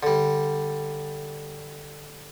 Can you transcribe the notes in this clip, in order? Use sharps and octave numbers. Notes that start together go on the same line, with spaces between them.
D3 G3